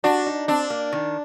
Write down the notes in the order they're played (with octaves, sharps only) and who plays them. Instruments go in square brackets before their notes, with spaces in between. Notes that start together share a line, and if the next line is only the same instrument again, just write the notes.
[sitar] D4 [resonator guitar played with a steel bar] F#4
[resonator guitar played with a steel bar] D#4
[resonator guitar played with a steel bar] C4 [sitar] D4
[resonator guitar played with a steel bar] A#3
D#3